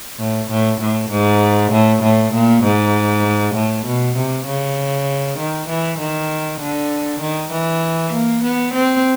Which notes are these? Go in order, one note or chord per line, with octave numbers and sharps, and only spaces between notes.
A2
A2
A2
G#2
A2
A2
A#2
G#2
A2
B2
C3
C#3
D#3
E3
D#3
D3
D#3
E3
A#3
B3
C4